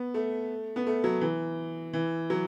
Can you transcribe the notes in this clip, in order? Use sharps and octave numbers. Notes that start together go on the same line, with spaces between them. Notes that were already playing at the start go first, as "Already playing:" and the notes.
Already playing: B3
A3
B3
A3
F#3
E3
E3
F#3